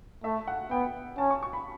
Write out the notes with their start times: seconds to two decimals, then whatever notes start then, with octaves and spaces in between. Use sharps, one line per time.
0.24 A3 E5
0.47 F#5
0.71 B3 G5
1.18 C#4 A5
1.31 C#6
1.43 C#6
1.53 B5